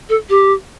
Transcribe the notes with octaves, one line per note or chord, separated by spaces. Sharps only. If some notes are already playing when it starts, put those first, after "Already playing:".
A4
G4